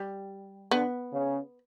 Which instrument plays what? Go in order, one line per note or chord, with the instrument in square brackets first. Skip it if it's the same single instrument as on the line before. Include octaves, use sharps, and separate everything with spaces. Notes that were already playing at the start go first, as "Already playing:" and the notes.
Already playing: [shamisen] G3
[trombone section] D3 [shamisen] B3
[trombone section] C#3